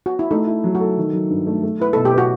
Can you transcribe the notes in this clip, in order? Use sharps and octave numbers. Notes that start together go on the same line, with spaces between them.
F#4
E4
A3 D#4
E4
F#3
F#4
A4
D#3
F#3
G2
A3
A3
E4 B4
B2 A4
G4
F#4 B4